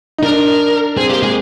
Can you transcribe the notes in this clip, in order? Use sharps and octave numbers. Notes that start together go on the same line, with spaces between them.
D#4
D4 A#4
C4 G#4
A#3 G4
G#3 G#4